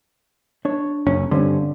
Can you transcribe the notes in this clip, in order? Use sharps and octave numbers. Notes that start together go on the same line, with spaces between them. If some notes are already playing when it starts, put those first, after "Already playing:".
D4 C#5
F#1 C#4
G2 D3 C4 C#4